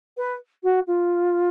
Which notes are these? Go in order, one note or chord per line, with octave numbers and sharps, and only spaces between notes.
B4
F#4
F4